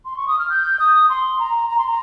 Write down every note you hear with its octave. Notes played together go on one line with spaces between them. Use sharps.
C6
C#6
D#6
F6
G6
D#6
C6
A#5
A#5
C6
A#5